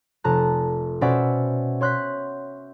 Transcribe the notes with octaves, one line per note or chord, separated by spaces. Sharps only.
F1 A5 A#5 F#6
B2 C#4 C5 D5 E5 F#5
C#5 C6 F#6 G6 B6